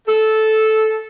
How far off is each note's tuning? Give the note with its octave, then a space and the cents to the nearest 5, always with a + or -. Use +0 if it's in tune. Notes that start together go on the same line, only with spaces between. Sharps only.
A4 -10